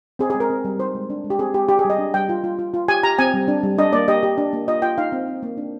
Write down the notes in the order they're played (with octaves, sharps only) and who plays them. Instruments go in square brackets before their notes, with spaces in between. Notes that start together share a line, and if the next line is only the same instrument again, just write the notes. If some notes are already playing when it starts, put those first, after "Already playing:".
[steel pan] C4 G#4
G#4
G#3
A#4
C4
G3
D#4 C5
G#3
D4
G#3
G4
C4 G#4
G#3 G4
D4 G4
G#4
G3 D#5
D4
G3 G5
F4
F4
F4
F4
G4 G#5
G4 A#5
C4 G#5
G3
D4
G3
D4 D#5
A#3 D5
G4 D#5
G4
D4
A#3
F4 D#5
F4 G5
D#4 F5
C4
D#4
A#3
D4